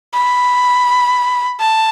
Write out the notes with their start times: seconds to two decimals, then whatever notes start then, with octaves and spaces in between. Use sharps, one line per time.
0.14 B5
1.60 A5